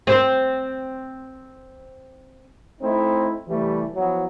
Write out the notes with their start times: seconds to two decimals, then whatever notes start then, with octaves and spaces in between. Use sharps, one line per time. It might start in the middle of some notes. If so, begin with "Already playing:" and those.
0.07 C4 C5
2.81 A3 C4 D#4 E4
3.47 C2 E3 G3 A3
3.95 F3 F#3 B3 E4